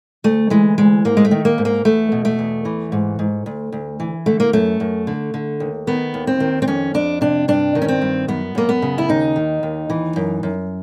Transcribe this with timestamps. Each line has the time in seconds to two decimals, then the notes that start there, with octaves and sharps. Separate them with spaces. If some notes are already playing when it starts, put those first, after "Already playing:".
0.24 D2 A3
0.50 E3 G#3
0.78 D2 G#3
1.05 G#2 A#3
1.17 G#3
1.25 A3
1.31 D#3
1.45 A#3
1.58 G#2
1.65 A#3
1.85 E2 A3
2.12 B2
2.25 A3
2.39 E2
2.65 E3
2.92 G#2
3.19 G#2
3.46 D2
3.72 D2
4.00 E3
4.26 D3 A3
4.40 A#3
4.53 F#2 A3
4.80 F#2
5.07 D3
5.34 D3
5.60 D#2
5.87 D#3 B3
6.14 D#2
6.27 C4
6.40 D#3
6.62 C4
6.67 F2 C#4
6.94 F2 D4
7.21 C3 D4
7.48 G2 D4
7.75 D#3
7.82 C#4
7.88 C4
8.02 G2
8.28 F#2 B3
8.55 F#2 A#3
8.69 B3
8.82 C#3
8.98 E4
9.09 D#2 D#4
9.36 D#3
9.63 D#2
9.90 E3
10.16 F#2
10.43 F#2